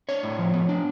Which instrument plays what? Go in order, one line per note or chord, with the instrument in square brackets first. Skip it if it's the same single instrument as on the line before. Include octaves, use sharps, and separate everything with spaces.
[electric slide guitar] D4 C#5
A2
F3
B3
D4